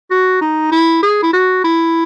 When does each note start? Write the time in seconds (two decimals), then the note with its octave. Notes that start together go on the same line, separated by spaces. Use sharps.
0.11 F#4
0.41 D#4
0.72 E4
1.03 G#4
1.23 E4
1.33 F#4
1.65 E4